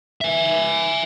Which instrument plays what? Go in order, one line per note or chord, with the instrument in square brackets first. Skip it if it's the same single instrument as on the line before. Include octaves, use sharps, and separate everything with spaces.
[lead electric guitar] E5 G#5